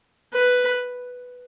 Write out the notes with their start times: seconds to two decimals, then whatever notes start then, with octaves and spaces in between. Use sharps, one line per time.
0.33 B4